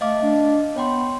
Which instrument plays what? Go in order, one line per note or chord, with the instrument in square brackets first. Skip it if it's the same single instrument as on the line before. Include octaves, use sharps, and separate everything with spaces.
[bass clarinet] A3 [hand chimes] D#5 F5 D6
[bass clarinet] D4
[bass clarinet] B3 [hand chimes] C#5 G5 C6